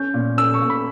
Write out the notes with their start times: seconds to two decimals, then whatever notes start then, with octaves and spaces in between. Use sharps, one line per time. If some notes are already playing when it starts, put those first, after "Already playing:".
Already playing: C#4 G6
0.14 A#2
0.37 C#4 E6
0.54 C#6
0.61 A#2
0.70 B5